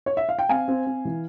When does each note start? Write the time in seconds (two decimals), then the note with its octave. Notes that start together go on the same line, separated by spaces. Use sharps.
0.06 C#5
0.17 E5
0.29 F5
0.39 G5
0.49 C4 F5 G#5
0.68 C4
0.86 C4
1.05 E3